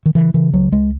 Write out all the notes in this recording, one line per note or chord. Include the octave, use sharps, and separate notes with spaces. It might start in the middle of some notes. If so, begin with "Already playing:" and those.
D#3
C#3 E3
C#3 E3
C#2 F#3
C#2 G#3